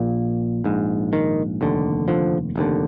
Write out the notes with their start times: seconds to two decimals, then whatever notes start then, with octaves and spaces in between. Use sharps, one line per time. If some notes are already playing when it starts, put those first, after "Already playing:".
Already playing: A#1 A#2
0.64 A#1 G#2
1.13 D#3
1.61 F1 D#2 D3
2.08 D3 F3
2.56 F1 D#2 D3